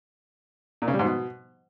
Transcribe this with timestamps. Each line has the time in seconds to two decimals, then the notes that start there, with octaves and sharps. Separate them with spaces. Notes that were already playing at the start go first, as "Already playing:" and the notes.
0.82 A#2
0.88 C#3
0.93 G3
0.99 G#2
1.05 B2